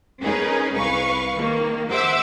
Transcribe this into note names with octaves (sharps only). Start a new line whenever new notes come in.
C#4 D#4 G#4 A#4 B4
C2 B4 F5 C#6
D#3 A#3
C5 E5 F#5 D6 E6